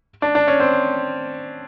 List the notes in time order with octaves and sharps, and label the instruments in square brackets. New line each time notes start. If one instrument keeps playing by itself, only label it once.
[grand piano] D4
D4
C#4
C4